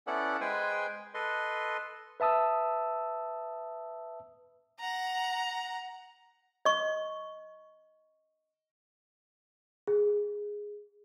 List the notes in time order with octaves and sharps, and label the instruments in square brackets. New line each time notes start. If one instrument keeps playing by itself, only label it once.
[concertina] B3 C#4 E4 A4 D5 F#5
G#3 B4 C5 G5 G#5
A4 B4 D#5 C6
[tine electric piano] B4 E5 A5 D#6 E6
[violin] F#5 A#5
[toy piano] D#5 C#6
[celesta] G#4